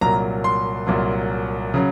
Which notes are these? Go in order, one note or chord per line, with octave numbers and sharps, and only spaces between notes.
C2 A#2 F#3 A#5
C6
C2 A#2 F#3
C#3 F#3